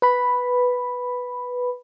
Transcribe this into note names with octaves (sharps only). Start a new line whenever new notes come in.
B4 B5